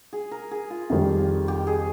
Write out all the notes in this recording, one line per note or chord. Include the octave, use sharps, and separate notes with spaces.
G#4
A#4
G#4
F4
F2 D#3 G3
G4
G#4